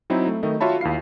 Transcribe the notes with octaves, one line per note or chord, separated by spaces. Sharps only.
F#3 C4 D#4 E4
A3
D#3 A3 D#5
F4 F#4 C#5 E5 A5 B5
D#2 E4 F5 C7